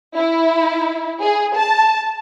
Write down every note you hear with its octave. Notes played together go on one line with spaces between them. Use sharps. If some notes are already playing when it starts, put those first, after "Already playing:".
E4
G#4
A5